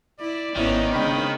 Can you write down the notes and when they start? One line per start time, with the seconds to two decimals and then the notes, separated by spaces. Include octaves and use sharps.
0.21 E4 D5
0.56 G#1 D#3 B3 C#4 E4 C#5
0.93 C#3 G#3 C4 D4 G5 B5